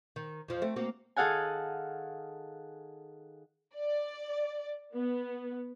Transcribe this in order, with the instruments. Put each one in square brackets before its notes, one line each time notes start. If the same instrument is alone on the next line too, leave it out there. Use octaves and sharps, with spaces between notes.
[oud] D#3
F2 F3
A3 C4
A#3 C4 F#4
[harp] D#3 G#4 A4 F5 F#5 G#5
[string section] D5
B3